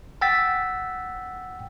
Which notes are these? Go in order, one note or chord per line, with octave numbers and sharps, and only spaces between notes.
F#5 G5 E6 A6 B6